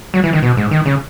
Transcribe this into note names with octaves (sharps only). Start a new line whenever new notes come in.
F#3
E3
D#3
B2
G#2
D#3
C#3